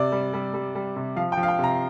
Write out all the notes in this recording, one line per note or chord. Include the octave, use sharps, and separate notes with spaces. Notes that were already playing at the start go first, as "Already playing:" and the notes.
Already playing: C3 D5
G3
G3
G3
G3
C3
F3 F5
G5
F3
F5
G5
C3 A#5